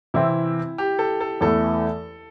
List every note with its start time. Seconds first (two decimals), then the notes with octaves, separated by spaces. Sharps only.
0.14 C3 E3 C4 E4
0.78 G4
0.99 A4
1.21 A4
1.41 E2 E3 A3 A4